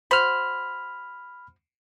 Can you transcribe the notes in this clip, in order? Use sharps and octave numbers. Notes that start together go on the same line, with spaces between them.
F#4 C5 B5 F6